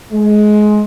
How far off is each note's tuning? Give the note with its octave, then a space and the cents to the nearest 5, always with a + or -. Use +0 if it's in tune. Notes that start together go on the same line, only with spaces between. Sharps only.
G#3 +20